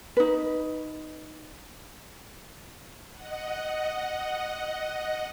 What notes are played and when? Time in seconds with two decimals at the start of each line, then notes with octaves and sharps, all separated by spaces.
0.17 D#4 B4
3.13 D#5 F#5